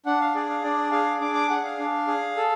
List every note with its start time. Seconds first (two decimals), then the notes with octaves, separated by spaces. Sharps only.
0.06 D4 F#5
0.21 F5
0.35 G#4 D5
0.50 F5
0.64 D4 D5
0.92 G#4 F5
1.21 D4 D6
1.35 D6
1.50 G#4 F#5
1.64 F5
1.79 D4
2.07 G#4
2.37 A4